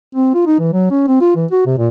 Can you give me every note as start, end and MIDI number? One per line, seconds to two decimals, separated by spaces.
0.15 0.31 60
0.34 0.46 65
0.46 0.57 63
0.59 0.72 52
0.73 0.88 54
0.91 1.04 61
1.07 1.19 60
1.21 1.31 65
1.36 1.46 52
1.51 1.62 66
1.66 1.75 48
1.78 1.88 46